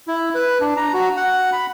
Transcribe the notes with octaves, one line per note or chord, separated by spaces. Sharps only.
E4
B4
D4
A#5
F#4
F#5
B5